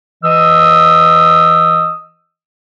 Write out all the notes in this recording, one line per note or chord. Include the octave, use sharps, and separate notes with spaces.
E3 D#5 D#6 E6